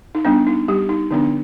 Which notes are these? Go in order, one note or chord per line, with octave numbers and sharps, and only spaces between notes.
D#4
G3 B3 D4
D#4
G3 G4
D#4
D3 F3 B3 D4 D#4